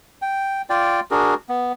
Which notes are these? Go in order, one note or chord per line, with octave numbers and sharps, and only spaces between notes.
G5
F4 D5 G5
D4 F#4 G#4 A#4
B3